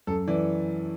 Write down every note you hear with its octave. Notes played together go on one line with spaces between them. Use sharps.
F#2 A4
E3 D5